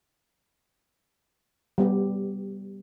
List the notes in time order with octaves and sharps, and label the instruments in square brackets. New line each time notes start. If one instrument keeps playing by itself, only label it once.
[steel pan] G3 B3 G4